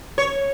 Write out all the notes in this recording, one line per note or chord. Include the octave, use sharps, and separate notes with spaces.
C#5